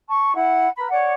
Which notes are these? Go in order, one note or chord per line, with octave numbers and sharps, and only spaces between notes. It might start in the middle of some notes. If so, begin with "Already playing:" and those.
A5 C#6
E4 F#5
A#4 B4 B5
C#5 D5 F#5 D6